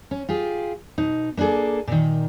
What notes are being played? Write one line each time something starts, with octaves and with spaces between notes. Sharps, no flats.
C#4
F4 G4 G#4
B2 D#4
A#3 D4 F4 G#4 A4
A#2 D#3